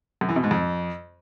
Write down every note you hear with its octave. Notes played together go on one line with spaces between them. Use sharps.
F#2
E3
B2
G#2
F2